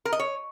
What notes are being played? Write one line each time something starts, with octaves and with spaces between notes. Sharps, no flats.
A#4
D#5
C#5